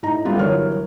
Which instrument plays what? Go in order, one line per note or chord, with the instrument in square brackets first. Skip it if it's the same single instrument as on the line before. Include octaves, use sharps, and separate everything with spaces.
[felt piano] A2 D#4 A#5
G3 A3 B3 F4 G4
G1 E3 F#3 A#4 C#5 F6